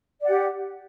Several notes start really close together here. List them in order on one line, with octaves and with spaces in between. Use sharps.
D5 F#5 G4